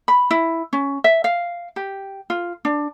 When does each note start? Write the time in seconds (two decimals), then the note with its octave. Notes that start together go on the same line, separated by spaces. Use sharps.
0.08 B5
0.31 E4
0.73 C#4
1.04 E5
1.24 F5
1.76 G4
2.30 F4
2.65 D4